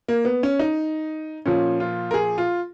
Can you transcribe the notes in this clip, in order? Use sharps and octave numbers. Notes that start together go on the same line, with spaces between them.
A#3
B3
C#4
D#4
A#2 F3 C#4
F4
A#4
G#4
F4